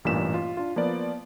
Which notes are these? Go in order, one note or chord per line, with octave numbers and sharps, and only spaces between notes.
A1 G2 A#2 B6 E7
F4
D4 F4
F3 A#3 B3 D5